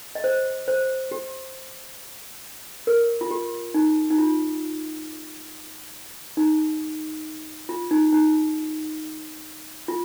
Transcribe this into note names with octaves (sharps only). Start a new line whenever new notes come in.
D#5
C5
C5
G4
A#4
F4
G4
D#4
D#4
F4
D#4
F4
D#4
D#4
F4